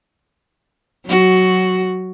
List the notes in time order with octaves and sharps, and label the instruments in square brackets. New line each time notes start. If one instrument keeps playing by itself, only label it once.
[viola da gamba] F#3 F#4